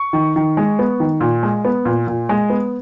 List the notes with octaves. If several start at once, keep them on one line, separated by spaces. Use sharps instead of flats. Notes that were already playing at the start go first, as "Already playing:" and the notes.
Already playing: C#6
D#3
D#3
G#3
B3
D#3
A#2
G#3
B3
A#2
A#2
G#3
B3